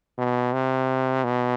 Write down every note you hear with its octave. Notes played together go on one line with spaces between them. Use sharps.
B2
C3
B2